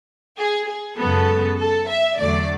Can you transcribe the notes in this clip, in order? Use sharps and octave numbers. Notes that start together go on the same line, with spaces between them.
G#4
G#4
F#2 C#3 G#3 B3 A4
A4
E5
E2 D3 F#3 A3 D5